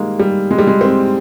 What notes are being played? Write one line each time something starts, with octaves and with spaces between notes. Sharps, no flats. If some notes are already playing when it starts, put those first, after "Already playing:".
Already playing: D#3 G3 G#3 A#3
G3
G#3
G3
G#3
C4